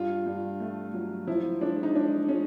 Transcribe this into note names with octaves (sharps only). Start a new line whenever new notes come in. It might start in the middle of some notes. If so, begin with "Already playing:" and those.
Already playing: G2 F4
G2
A3
F#3
F3 E4
G#3 D4
D#4
G#3 D4
G#3 C#4